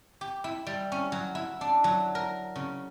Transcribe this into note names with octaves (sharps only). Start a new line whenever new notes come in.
G4
E4
G3
C#4
F#3
E4
D4
F#3
A#4
C#3